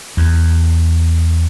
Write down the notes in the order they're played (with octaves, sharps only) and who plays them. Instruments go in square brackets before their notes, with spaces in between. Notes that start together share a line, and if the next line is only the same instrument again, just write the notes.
[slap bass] E2